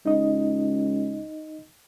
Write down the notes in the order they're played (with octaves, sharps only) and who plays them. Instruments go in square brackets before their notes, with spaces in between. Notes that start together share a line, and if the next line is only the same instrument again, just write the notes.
[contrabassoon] C#2 [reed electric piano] D#4 D#5